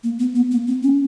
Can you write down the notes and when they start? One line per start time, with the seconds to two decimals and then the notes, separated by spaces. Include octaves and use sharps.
0.04 A#3
0.20 B3
0.35 B3
0.51 A#3
0.68 C4
0.83 C#4